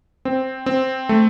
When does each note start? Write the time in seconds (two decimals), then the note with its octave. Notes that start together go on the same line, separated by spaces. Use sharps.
0.25 C4
0.66 C4
1.09 A3